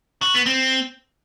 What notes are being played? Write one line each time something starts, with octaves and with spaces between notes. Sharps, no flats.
F#4
B3
C4